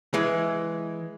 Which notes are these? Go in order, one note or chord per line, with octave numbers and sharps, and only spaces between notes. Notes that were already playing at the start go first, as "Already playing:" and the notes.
E3 G#3